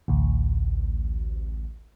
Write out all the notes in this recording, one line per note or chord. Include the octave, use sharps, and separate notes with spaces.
A1 D2